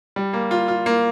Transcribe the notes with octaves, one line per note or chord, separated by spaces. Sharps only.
G3
A#3
F4
F4
A#3